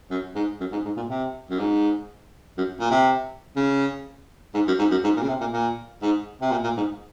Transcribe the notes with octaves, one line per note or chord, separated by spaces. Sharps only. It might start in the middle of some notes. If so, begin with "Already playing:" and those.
F#2
G#2
F#2
G#2
G#2
A#2
C3
F#2
G#2
F#2
A#2
C3
C#3
G#2
F#2
G#2
F#2
G#2
A#2
C#3
C3
A#2
A#2
G#2
C3
A#2
A#2
G#2